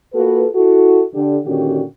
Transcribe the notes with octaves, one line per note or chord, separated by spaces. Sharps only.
A#3 F4 F#4 A4 B4
E4 F#4 A4
D3 G4
A#2 D3 D#3 C#4 F#4 G4